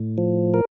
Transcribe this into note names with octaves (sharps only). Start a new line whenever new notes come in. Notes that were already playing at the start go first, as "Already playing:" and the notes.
Already playing: A2
F3
A#4